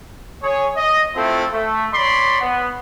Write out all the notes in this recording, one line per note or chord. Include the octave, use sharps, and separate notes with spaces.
G#4 C#5
D#5
A3 C4 E4 F4 A4
A3
C#5 D5 B5 C6
B3